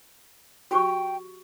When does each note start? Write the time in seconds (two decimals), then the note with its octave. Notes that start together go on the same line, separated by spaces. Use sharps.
0.71 F#4 G4 G5 C#6